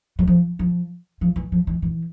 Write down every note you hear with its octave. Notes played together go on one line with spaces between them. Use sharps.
F#3
F3
F3
F3
E3
F3
E3
E3